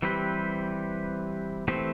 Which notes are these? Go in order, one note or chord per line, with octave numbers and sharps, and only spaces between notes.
E3 G3 C4 G4 B4
E3 A3 C4 G4 C5